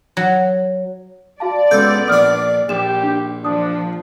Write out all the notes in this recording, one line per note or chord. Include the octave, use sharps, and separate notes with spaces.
F#3
F#4 D5 F5 A5
C#2 B3 A4 E6 G6
A#1 D4 D#6 F6
A#1 G4 E7
D4
F3 D4 D#6